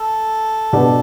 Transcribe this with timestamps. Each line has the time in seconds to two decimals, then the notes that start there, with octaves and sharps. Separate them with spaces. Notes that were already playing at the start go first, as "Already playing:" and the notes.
Already playing: A4
0.73 B2 B3 D4 G4 B4